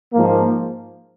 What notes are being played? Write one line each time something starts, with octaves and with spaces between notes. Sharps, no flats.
G#2 F3 A#3